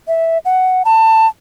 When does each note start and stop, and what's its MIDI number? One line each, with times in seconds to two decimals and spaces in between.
0.08 0.38 76
0.45 0.83 78
0.85 1.27 81